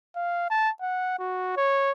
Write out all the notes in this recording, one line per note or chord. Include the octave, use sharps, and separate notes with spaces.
F5
A5
F#5
F#4
C#5